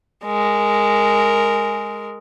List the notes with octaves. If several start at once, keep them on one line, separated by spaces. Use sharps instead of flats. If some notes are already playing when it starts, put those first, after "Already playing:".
G#3 A#4